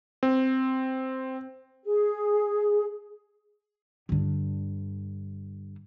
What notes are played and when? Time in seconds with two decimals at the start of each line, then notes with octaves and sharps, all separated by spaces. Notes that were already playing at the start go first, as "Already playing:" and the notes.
0.23 C4
1.85 G#4
4.09 G2 D3